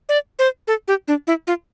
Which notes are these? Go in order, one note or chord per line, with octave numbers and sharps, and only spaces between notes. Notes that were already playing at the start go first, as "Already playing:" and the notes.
D5
C5
A4
G4
D4
E4
F4